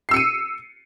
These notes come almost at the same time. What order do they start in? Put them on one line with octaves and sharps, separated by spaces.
C7 E6 C#7 D#7